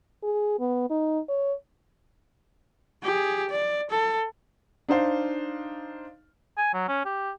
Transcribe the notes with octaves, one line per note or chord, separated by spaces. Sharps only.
G#4
B3
D#4
C#5
G4 G#4
D5
A4
D4 D#4 C5 F5
G#5
F#3
C#4
G4